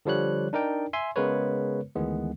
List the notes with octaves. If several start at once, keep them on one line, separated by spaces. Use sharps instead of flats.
D3 F3 G3 C#5 F#6
D4 D#4 A#4 D5 G5
E5 G#5 C6
C#3 G#3 B3 A#4 B4 C#5
D2 D#3 E3 G#3 B3